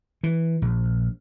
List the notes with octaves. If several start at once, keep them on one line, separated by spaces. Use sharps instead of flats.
E3
A#1